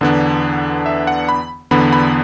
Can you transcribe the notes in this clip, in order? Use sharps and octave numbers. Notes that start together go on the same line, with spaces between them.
E2 D3 B3 D4
E5
F#5
B5
E2 D3 B3 D4 B5
B5